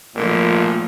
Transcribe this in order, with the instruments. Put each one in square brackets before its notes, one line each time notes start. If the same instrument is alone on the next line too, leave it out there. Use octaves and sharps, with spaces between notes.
[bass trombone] G#1 [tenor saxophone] A#2 [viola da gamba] F3 A3 A#3